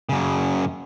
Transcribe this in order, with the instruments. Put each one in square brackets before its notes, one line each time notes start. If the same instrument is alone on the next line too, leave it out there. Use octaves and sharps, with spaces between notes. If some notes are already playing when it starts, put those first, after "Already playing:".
[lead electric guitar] F#2 C#3